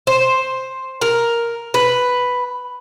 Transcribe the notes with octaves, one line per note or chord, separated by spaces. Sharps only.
C5
A#4
B4